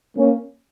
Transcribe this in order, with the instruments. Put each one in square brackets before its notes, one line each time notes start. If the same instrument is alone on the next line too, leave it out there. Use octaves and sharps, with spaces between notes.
[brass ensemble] A#3 C#4